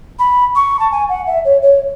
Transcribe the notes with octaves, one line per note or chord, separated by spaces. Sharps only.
B5
C#6
A5
G#5
F#5
E5
C#5
C#5